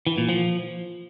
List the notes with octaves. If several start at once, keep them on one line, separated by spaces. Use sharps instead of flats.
E3
A#2
F3